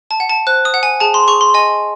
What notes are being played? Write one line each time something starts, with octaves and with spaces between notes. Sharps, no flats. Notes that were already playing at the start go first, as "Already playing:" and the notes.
A5
F#5
A5
C5 F#6
D#6
F#5
G#5
G#4 A5
C6
G#4 C#6
C6
D#5 G#5